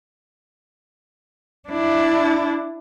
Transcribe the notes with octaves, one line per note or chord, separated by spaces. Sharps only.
D4 E4